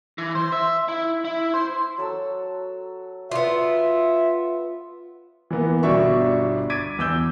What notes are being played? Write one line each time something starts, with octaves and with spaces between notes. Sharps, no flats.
E3
C5
E5
E4
E4
C5
F#3 A4 E6
B3 F4 E5
E3 A#3 B3
G1 B2 D4 E5 C#6
D6 G#6 A6 B6 D7 D#7
E2 D6 E6 G6 G7